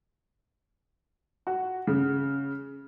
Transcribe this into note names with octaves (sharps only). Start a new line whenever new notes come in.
F#4
C#3